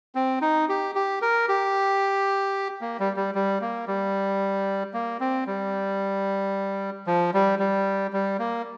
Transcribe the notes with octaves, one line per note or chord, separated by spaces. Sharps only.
C4
D#4
G4
G4
A#4
G4
A#3
G3
G3
G3
A#3
G3
A#3
C4
G3
F3
G3
G3
G3
A#3